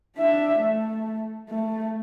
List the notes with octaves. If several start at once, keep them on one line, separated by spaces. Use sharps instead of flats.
D4 E5
A3
A3